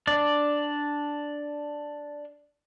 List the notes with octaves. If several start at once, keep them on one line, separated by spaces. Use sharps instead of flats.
D4 D5